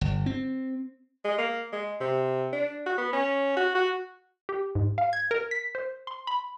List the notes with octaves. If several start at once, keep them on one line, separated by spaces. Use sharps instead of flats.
G1
C4
G#3
A#3
G#3
C3
D4
F#4
B3
C#4
F#4
F#4
G4
G#2
F5
G#6
A#4
B6
C5
C6
B5